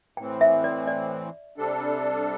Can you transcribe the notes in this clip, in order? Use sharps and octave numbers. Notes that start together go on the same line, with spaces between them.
A2 E3 C4 G5
E5
D5
D5
C3 G3 D4 A4